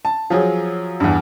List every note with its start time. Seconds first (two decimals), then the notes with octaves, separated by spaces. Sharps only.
0.05 A5
0.30 F3 F#3 G#4
1.00 E2 G2